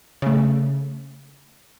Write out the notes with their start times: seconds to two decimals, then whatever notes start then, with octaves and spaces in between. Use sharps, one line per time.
0.22 C#3 A3